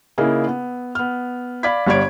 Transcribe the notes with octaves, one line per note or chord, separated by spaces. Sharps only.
C#3 A#3 D#4 E4 G#4
B3
B3 F6
D5 F5 B5 D6 G#6 B6
G1 G3 C#5 D5 G#6 D7